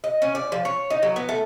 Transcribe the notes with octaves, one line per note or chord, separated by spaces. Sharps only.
D#5
C#4
D5
F3
C#5
D#4
F#3
B3
A3